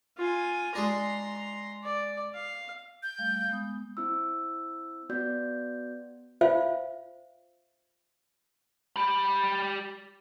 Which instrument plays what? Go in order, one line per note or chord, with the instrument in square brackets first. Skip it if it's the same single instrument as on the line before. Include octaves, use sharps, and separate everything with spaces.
[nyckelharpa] F4 G#5
[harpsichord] G#3 D4 [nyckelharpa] A#5 C6
[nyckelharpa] D5
F5
[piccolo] G6
[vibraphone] G3 A3 F5
G#3 B3 D#6
[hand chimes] C4 E4 E6
B3 F#4 D5 G6
[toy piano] F4 C5 E5 F5
[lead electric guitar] G4 B5